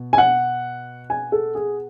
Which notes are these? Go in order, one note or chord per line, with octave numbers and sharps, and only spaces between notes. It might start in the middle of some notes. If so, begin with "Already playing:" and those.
Already playing: B2
G#5
F#5
G#5
A4
G#4